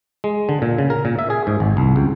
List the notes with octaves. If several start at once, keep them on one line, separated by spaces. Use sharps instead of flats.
G#3
D3
A#2
C#3
A#4
A#2
E5
G#4
G#2
G#1
C2
C#2